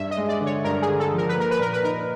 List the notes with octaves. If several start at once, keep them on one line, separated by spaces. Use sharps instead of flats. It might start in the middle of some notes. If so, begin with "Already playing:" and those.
Already playing: G2 E5
D#5
G#3
D5
D3
C#5
G2 A#4
G#4
D3
A4
F3
A#4
B4
A#3 A#4
B4
A#2 A#4
B4
D#4 A#4